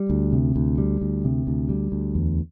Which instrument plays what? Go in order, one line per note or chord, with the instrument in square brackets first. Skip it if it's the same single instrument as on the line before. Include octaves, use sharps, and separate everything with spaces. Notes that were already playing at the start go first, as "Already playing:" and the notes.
Already playing: [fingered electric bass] G3
D2
C3
D2
G3
D2
C3
D2
G3
D2
E2